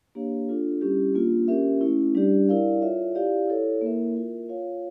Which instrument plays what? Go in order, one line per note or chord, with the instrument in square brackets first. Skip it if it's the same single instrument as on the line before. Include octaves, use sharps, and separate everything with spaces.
[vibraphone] A#3 D4 G4 C#5 F5
D4 F4 A4
G3 C#4 E4 G4
A#3 D4 F4
C#4 G4 A#4 E5
A3 C#4 E4
G3 D4 G4 D5
E4 A#4 D5 F5
F4 A4 C#5 E5
E4 G4 D5 F5
E4 A4 C#5
A#3 E4 A#4 E5
F4 A#4 E5
F4 C#5 F5